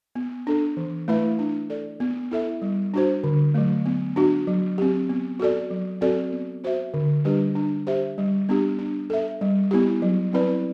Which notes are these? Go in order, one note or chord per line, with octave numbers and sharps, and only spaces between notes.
B3
D4 A4
E3
A3 E4 B4 E5
D4
A4 D5
B3
E4 A4 E5
G3
D4 F#4 C5
D3
F#3 A3
B3
D4 F#4
F#3
C4 G4
B3
F#4 A4 D5
F#3
C4 F#4 A4 D5
B3
F#4 C5 E5
D3
G3 D4 G4 B4
D4
G4 C5 E5
G3
B3 D4 G4
D4
A4 E5
G3
B3 E4 G4
F#3
C4 E4 B4 D5